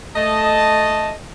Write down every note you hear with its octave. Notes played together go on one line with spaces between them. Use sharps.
A3 D#5 A5